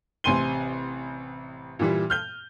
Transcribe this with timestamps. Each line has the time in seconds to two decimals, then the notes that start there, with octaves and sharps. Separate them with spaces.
0.24 A1 C3 G#5 C6 D#7 G7
1.79 A#2 E3 G3
2.10 F6 G6 G7